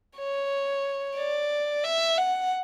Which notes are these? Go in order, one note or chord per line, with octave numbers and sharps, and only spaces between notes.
C#5
D5
E5
F#5